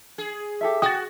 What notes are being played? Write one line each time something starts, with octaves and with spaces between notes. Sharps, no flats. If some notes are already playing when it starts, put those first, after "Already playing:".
G#4
G4 A4 E5
F#4 G#4 G5 D#6 A6